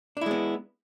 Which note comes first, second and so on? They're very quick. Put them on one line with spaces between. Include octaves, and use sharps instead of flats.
D4 E4 G#3 B3